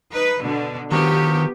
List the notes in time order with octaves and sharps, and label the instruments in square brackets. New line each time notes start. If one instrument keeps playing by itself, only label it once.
[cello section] D#4 B4
B2 D3
[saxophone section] D3 F3 F#3 [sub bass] D#3 [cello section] B3 G4